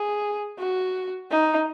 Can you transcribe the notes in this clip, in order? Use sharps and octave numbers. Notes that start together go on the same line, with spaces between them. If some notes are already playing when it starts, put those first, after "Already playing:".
Already playing: G#4
F#4
D#4